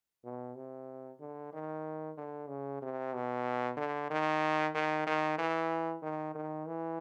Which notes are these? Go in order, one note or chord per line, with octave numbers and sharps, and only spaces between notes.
B2
C3
D3
D#3
D3
C#3
C3
B2
D3
D#3
D#3
D#3
E3
D#3
D#3
E3